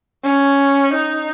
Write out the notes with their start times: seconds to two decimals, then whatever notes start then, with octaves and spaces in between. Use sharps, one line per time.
0.24 C#4
0.94 D#4